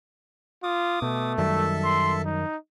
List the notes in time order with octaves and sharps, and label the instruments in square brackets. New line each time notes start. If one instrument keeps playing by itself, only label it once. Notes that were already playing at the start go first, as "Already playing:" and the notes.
[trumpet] F4 [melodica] D6 D#6
[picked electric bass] B2 [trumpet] A3
[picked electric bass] F#2 D#3 G3 [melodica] A4 E5
[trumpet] C6
D#4